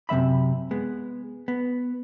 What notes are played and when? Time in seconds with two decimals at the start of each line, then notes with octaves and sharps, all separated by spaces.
0.09 F#2 C3 F#3 E5 B5
0.71 G#3 B3
1.48 B3